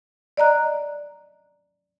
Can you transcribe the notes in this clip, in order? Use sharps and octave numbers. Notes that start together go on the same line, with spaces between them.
D5 D#5 A#5 F#6